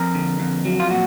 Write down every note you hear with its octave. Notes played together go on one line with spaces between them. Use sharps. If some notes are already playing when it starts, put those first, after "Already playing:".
Already playing: F2 A#4
D3
F2
F#3
F4
A#2 F#4